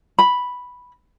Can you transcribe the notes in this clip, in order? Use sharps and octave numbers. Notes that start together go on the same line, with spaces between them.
B5